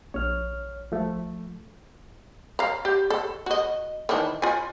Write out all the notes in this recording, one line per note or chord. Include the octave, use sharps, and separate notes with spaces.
A#1 C#5 F6
F3 A3
F5 A#5
G4
A4
F#4 D#5
D#3 E3 D4
F4 G#5